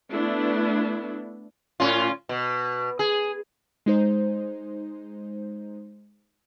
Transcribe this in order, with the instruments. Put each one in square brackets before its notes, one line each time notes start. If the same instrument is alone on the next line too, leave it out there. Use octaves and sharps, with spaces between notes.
[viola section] A3 B3 D4 E4
[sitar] A2 C#4 F4
B2
G#4
[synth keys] G#3 D#4 C5